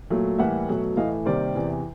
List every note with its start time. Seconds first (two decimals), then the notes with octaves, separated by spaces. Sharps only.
0.10 A#2 F#3 A3
0.38 A2 E3 G3 A#3 E5 F#5
0.68 B2 F#3 A3
0.96 A2 E3 A3 D#5 F5
1.25 C3 D#3 G3 A#3 C5 D5
1.55 E2 C3 E3